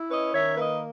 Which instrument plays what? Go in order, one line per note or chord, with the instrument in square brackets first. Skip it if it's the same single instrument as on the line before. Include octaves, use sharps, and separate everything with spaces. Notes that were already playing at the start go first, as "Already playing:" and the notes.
Already playing: [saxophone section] E4
C#4 B4 D#5
D#3 C#5 E5
A#3 B4 D#5